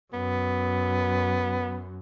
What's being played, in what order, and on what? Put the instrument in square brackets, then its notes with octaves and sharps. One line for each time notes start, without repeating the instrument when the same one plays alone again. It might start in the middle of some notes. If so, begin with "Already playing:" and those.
[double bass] F#2 [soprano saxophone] B3